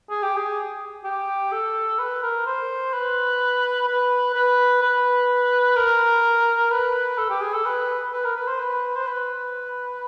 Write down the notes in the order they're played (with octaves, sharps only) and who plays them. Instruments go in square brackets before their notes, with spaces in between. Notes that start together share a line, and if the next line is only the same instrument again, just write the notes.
[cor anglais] G#4
G4
G#4
G4
A4
B4
A#4
C5
B4
B4
B4
B4
A#4
B4
A4
G4
G#4
A4
B4
B4
A#4
B4
C5
B4
C5
B4